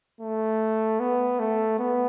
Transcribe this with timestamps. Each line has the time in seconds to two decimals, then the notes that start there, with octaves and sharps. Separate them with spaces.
0.21 A3
1.00 B3
1.39 A3
1.79 B3